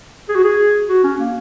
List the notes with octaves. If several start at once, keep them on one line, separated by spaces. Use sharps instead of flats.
G#4
F#4
G#4
F#4
C#4
A#3